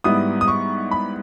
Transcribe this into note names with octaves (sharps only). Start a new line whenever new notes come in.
G#2 G3 B3 E4 D#6
D#6
C#6
B5